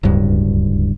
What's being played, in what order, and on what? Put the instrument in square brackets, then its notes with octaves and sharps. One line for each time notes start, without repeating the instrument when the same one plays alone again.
[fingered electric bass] D1 C#2 G2